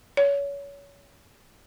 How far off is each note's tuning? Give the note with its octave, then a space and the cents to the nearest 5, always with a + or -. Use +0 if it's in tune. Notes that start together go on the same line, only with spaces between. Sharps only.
C#5 +30